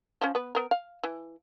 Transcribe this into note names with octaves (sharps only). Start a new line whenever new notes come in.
F3 C#4
B3 B4
B3 A#4
F5
E3